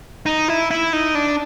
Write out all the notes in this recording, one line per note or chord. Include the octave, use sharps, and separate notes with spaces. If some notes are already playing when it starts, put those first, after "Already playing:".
D#4
E4
E4
D#4
D4